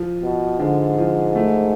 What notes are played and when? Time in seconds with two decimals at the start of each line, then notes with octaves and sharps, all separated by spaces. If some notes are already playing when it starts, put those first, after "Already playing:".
Already playing: F3
0.22 B2
0.59 G#2 D3
0.98 F3
1.35 A3